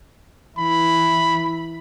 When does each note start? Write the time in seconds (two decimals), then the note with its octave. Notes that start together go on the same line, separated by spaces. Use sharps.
0.58 E3 E4 B5